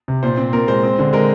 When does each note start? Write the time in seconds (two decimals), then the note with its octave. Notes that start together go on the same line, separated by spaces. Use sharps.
0.08 C3
0.23 A#2 C5
0.37 C4
0.53 A#2 A#4
0.68 G#3 C5
0.83 C4
0.99 D3
1.13 G#3 A#4